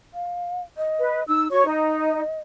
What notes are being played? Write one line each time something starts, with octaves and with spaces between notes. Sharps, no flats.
F5
D#5
B4
D#4 E6
F#4 C#5 C#6
D#4 D#5